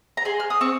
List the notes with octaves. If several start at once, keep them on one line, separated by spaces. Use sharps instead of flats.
A#5
G#4 C6
F6
D#6
C4 C#6